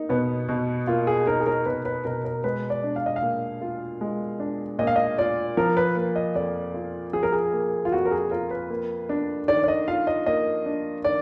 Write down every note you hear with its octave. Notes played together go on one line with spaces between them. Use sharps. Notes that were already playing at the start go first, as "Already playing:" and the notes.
Already playing: A#3 D#4
B2 B3
B2
A#3 F4
G#4
D#4 A#4
G#4
A#4
B2 B4
B4
B2 A#4
A#4
G#3 B4
D5
D4
F5
D#5
F5
A#2
F4
G#3
D4
A#2 D#5
F5
D#5
F4 D5
F3 A#4
B4
A#3
D#5
F2 D5
F4
F3 G#4
A#4
G#4
A#3
F4
F2 F#4
A#4
G#4
F4 A#4
B4
A#3
D4
D#3 D5
D5
D#5
F4 F5
D#5
A#3 D#5
D4
D#3 D5